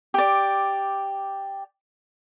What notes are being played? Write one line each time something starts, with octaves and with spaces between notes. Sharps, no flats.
G4 D5